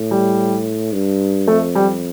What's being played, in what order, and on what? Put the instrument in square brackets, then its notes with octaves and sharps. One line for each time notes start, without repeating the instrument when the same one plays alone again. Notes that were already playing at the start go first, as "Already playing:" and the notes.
Already playing: [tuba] A2
[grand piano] G3
[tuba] G2
[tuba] F2 [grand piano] A3
[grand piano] G3